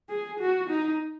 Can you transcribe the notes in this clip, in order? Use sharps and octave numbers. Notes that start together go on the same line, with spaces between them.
G#4
F#4
D#4